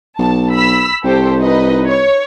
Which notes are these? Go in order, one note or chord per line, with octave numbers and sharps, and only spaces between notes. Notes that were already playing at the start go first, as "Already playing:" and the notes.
B1 A5
B5 E6 B6
C2 G4 A4 C5
D#4 B4 D#5
C#5